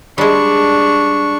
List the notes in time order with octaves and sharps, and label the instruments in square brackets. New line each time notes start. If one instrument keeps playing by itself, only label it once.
[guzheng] G3 G#3 [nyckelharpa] D4 C#6